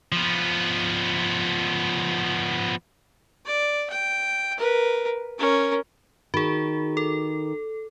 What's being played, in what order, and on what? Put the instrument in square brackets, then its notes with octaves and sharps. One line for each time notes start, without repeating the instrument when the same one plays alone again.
[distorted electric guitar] F3 B3
[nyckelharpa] D5
G5
A#4 B4
C#4 A#4
[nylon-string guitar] D#3 [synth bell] F#4 G#4
[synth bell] A4